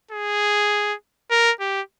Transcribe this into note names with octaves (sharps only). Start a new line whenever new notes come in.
G#4
A#4
G4